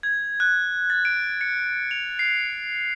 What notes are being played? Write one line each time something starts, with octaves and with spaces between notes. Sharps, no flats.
G#6
F#6
A6
D7
C#7
F7
C7